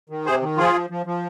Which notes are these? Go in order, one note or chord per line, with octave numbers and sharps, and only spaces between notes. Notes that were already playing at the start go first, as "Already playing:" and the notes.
D#3
C3 G#4 C5
D#3
F3 F4 G#4
F3
F3
F3